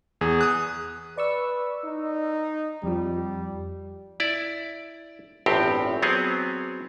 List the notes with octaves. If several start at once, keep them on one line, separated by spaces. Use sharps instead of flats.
E2 G#4
D#6 F#6
B4 D5 C#6 E6
D#4
F2 F3 G3
E4 D5
G1 E2 A2 C4 G4
F#3 B3 C4 G#4 C#5